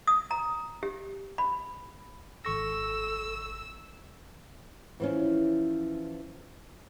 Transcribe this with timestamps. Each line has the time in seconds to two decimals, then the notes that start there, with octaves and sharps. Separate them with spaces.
0.07 D#6
0.31 A#5
0.83 G4
1.38 B5
2.45 G#1 A4 C#6 E6 A#6
5.00 E3 F3 C#4